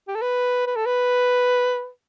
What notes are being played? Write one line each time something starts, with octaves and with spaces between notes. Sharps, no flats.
G4
A4
B4
B4
A4
B4